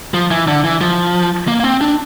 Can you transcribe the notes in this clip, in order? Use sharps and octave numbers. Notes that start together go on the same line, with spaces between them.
F3
E3
D3
E3
F3
A#3
A#3
C4
D4